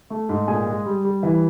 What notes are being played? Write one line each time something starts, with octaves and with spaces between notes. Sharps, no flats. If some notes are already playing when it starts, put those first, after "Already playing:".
A3
G#2
A#2 G#4 G#5
G#3
G3
G3
E3